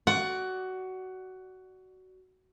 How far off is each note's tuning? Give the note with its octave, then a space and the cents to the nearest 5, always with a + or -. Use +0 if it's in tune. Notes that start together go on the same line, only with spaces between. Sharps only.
F#4 +15 D5 +0 F#5 +15